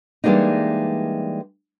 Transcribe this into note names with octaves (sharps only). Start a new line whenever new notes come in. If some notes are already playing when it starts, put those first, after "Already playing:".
E3 G3 G#3 A#3 D4 D#4